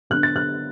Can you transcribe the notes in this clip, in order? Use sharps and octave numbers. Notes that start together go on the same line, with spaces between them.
D3 B3 D4 F#6
A6
F#6